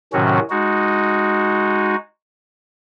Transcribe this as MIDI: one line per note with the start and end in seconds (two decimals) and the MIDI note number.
0.13 0.39 45
0.13 0.39 48
0.13 0.39 51
0.13 0.39 54
0.13 0.39 61
0.13 0.39 66
0.50 1.96 56
0.50 1.96 63
0.50 1.96 66